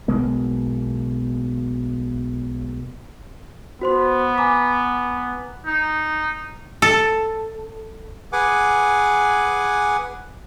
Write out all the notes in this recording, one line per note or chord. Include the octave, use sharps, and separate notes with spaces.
B1 B2 G#3 A#3
B3 F#4 C5 C6
G#5 A#5 D6
D#4
A4
G#4 B4 F#5 G#5 D6